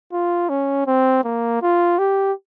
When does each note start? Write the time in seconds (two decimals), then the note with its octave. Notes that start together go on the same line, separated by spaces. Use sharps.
0.13 F4
0.49 C#4
0.86 C4
1.24 A#3
1.62 F4
1.99 G4